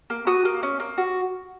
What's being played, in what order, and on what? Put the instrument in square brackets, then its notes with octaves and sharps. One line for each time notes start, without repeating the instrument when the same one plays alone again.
[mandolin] A#3
F#4 D#6
A#3
C#4
A#3
F#4